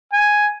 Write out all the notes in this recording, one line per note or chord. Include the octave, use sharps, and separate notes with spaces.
G#5